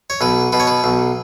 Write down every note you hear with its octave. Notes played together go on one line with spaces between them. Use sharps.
C#5
B1 B4
B2 B4
C#5
B4
B1